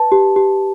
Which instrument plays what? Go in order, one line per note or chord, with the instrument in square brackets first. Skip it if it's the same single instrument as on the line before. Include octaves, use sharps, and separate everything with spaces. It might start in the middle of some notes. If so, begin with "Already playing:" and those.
Already playing: [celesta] B4 A5
G4
G4